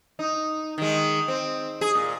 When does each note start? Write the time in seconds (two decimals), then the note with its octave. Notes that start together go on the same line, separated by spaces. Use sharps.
0.19 D#4
0.78 D#3 G#3
1.28 C4
1.81 G#4
1.95 A#2